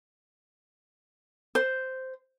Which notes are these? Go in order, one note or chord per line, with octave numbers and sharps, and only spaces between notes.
C5